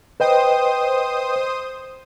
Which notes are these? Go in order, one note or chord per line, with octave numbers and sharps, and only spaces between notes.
B4 C5 D#5 G5 D#6